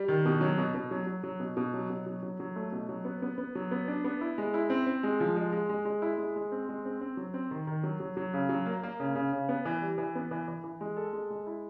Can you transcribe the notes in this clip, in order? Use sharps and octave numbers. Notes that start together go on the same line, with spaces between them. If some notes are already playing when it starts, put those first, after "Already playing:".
Already playing: G3
D#3
B2
F#3
B2
B2
F#3
F#3
F#3
B2
B2
F#3
B2
F#3
F#3
F#3
A3
B2
F#3
B3
B3
B3
F#3
B3
D4
B3
E4
G#3
E4
C4
C4
G#3
F3
G#3
G#3
G#3
G#3
E4
G#3
G#3
C4
G#3
C4
C4
F#3
C4
D#3
D#3
F#3
F#3
F#3
C#3
F#3
A#3
A#3
C#3
C#3
C#3
B3
E3
G3
E3
B3
E3
E3
E3
G#3
A4
G#3
G#3
E4